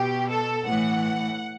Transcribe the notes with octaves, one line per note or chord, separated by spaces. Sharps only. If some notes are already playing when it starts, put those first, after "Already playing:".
Already playing: B2 G4
A4
A2 E3 F#5